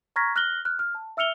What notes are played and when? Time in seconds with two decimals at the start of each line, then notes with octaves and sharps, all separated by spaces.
0.16 A#5 C#6 F6 G#6 A#6 B6
0.36 F6 F#6 A#6 F#7 G7
0.65 F6 F#6
0.79 F6
0.95 A5
1.17 E5 E6 F6 C#7 F7 G7